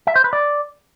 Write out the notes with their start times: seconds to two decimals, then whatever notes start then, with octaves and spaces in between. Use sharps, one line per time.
0.07 E5
0.16 C5
0.24 B4
0.33 D5